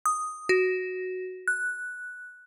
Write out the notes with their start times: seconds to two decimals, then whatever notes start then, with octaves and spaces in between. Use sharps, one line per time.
0.06 D#6
0.49 F#4
1.48 F#6